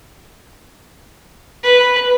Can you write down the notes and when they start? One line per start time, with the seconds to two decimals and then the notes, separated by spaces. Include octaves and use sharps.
1.63 B4